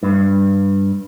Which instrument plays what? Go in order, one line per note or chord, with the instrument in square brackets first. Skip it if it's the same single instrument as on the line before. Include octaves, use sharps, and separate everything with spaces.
[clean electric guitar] G2